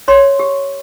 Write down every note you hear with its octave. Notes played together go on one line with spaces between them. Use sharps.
C#5 C6
G4